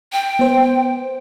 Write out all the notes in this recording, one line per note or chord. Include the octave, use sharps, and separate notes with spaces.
G5
B3 C5